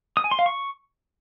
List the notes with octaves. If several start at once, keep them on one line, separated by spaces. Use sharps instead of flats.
D#6
G#5
C6
F5
C#6